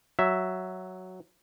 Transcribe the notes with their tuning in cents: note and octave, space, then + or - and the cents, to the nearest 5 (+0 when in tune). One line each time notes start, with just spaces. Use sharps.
F#3 +0 E5 +0